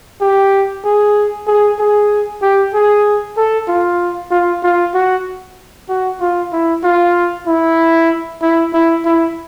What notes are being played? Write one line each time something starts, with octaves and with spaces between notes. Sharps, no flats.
G4
G#4
G#4
G#4
G4
G#4
A4
F4
F4
F4
F#4
F#4
F4
E4
F4
E4
E4
E4
E4